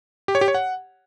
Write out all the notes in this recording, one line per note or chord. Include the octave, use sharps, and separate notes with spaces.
G4
C#5
G4
C#5
F#5